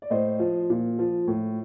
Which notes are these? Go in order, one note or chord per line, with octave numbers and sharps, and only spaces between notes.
D5
A2 C5 D#5
F3
A#2
F3
A2